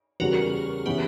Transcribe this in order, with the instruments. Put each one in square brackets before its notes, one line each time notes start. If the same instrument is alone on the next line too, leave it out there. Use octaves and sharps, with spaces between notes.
[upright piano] E2 C#3 G3 [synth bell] F#4 A#4
[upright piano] C#3 E3 B3 [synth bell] G4 B4